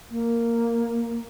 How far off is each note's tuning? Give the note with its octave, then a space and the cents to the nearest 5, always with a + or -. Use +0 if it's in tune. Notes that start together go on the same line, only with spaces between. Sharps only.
A#3 -5